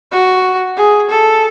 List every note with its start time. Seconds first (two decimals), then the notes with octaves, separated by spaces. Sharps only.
0.12 F#4
0.77 G#4
1.10 A4